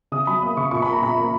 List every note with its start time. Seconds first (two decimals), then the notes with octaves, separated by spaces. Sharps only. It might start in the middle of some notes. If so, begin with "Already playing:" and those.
0.12 C#3 D#6
0.27 F#3 B5
0.42 A#3 D#6
0.57 C#3 C#6
0.71 A#2 C#6
0.82 A#3 B5
0.93 A#5
1.02 A#2 B5
1.17 A#3